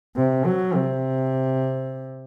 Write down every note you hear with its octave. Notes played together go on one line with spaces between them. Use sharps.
C3
F#3
C3